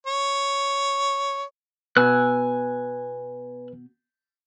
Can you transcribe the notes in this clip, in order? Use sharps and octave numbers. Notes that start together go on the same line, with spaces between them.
C#5
B2 B4 G#5 E6 F#6